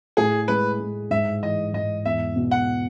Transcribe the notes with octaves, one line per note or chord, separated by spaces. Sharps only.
A2 G#4
G#3 B4
A2
G#2 E5
E3 D#5
G#2 D#5
E2 E5
B2
F#5